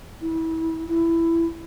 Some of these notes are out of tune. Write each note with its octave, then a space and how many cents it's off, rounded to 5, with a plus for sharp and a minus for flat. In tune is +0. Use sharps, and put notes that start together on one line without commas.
E4 -25
E4 +15